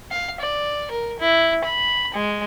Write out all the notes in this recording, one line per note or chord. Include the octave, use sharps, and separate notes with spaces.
F5
D5
A#4
E4
B5
G#3